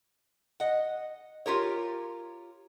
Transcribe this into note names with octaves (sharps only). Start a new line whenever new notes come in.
D#5 F#5
F4 G4 A#4 C#5